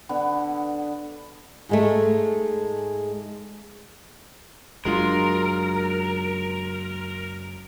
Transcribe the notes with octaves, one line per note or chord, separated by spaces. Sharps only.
D3 B3
G#2 G#3 A3
F#1 F#3 G#3 D4 F4 A#4